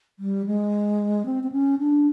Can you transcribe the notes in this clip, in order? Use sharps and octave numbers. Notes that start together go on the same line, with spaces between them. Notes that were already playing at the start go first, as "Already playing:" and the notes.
G3
G#3
C4
C4
C#4
D4